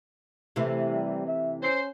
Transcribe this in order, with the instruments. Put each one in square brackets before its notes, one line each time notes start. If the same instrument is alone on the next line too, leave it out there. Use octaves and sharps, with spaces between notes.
[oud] C3 E3 A3
[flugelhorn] G3
E5
[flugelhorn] C#4 [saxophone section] C5